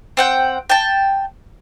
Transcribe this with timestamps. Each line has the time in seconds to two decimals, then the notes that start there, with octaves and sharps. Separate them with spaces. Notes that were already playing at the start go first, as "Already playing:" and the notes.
0.17 C4 F#5 G5
0.70 G5 A5